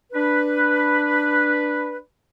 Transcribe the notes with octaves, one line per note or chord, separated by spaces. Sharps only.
D4 B4